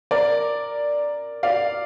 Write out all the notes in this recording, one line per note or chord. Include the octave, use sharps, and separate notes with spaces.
A#4 D5
D5 F5